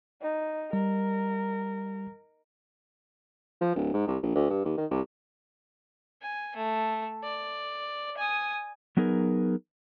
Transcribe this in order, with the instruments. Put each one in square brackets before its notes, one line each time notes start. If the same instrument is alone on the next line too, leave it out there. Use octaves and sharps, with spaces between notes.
[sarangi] D#4
[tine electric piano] G3 [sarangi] A#4
[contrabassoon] F3
D1
G#2
C2
A#1
D2
G2
D#2
D#3
C2
[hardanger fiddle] G#5
A3
D5
G#5 D#6
[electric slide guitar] F#3 B3 D#4 G#4 A#4